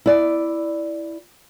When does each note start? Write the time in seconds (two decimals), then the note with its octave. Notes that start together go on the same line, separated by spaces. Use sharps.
0.06 E4 D5